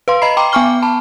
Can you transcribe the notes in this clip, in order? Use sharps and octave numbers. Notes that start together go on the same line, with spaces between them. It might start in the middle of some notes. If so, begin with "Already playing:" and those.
B4 F5 C6
D#5 A#5 B5 C7
G5 A#5 C6 D6
B3 G5 G#5 C#6 F6 G7
A5 B5